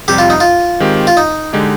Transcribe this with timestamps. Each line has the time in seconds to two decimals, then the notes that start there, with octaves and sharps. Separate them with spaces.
0.08 F2 C3 G3 G4
0.18 F4
0.30 D#4
0.40 F4
0.80 D#3 G#3 C4 G4
1.07 F4
1.17 D#4
1.53 D3 G#3 D#4 G4